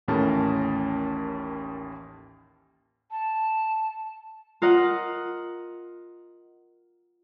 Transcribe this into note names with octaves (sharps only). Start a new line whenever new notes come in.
A1 D#2 A2 C#4 A#4 A5
A5
F4 A#4 D#5 F#5